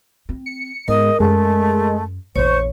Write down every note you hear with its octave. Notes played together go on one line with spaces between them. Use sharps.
C4
C#7
G#2 B3 A#4 D#5
F#2 G#3 A3
A#1 E2 C5 C#5 C#6